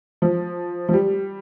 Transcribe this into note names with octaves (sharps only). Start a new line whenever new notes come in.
F3
F3
G3